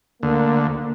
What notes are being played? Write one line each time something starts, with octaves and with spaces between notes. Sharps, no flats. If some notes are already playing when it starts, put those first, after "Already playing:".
D2 A#3